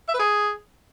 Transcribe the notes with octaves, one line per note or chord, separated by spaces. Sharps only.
E5
B4
G#4